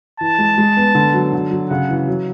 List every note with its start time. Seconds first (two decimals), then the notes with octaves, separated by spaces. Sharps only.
0.20 E3 A5
0.39 G#3
0.58 G#3
0.77 B3
0.95 D3
1.14 F#3
1.33 D3
1.51 F#3
1.70 C#3 F#5
1.89 E3
2.07 F#3